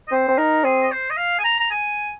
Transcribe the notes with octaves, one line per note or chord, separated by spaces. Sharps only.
D#5
C4 C5
C4
D#4 A#4
C4 G#4
D#5
C5
D#5
F5
G#5
A#5
A#5
G#5